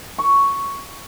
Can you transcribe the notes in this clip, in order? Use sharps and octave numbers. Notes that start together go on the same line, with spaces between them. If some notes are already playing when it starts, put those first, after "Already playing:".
C#6